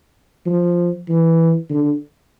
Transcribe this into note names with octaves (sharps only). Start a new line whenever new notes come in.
F3
E3
D3